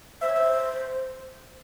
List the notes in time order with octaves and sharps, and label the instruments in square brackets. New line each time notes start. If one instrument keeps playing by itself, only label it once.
[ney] C5 [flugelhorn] E5
[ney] C#5
C5